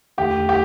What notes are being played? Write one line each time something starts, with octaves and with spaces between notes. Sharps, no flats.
E2 D3 A3 G4
G4